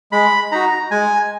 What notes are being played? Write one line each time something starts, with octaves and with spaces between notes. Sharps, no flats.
G#3 B5
D#4 F#4 A#5
G#3 G#5